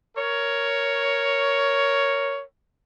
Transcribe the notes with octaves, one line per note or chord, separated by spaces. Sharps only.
A#4 C#5